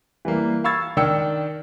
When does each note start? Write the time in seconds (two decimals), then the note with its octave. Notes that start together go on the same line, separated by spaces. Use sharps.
0.25 E3 G3 A#3
0.64 F5 B5 C#6 E6 G#6 A6
0.97 D#3 D4 G5 E6 C#7